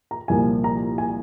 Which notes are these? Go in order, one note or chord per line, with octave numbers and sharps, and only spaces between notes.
A#5
C2 A#2 F3 A#3 G#5
A#5
G#5